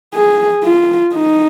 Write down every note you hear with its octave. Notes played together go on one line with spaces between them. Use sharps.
G#4
F4
D#4